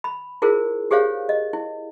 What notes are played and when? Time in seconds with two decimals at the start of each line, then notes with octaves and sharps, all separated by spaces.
0.04 B5
0.42 E4 F4 G#4 A#4 C5
0.91 G4 G#4 C5 C#5 F5
1.29 D#5
1.53 E4